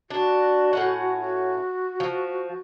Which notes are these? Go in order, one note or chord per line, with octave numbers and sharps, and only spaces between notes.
D4 F#4
A2 C#4 F#5
F#4
F3